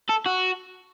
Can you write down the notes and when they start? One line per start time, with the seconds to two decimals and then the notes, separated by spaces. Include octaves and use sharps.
0.09 A4
0.26 F#4